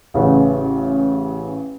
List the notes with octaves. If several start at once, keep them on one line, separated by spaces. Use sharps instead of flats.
A1 C#3 B4 F#5